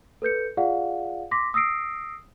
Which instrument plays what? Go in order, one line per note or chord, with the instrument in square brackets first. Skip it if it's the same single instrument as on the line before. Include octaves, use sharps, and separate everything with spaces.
[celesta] A4 B4 G6 C#7
F4 G#4 D5 F5 F#5
C6 D6 A#6 B6
D#6 E6 A#6 C7 D7